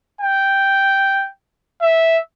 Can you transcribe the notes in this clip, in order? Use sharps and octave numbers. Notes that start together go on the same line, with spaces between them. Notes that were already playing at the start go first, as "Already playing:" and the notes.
G5
E5